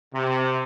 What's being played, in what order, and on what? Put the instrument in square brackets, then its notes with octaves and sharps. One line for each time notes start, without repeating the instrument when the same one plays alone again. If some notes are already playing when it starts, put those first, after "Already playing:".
[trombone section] C3